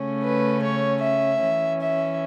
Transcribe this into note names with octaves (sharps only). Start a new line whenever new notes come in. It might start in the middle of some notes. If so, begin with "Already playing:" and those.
Already playing: C#3 A3 C#4
B4
C#5
E5
E3 C#4
E5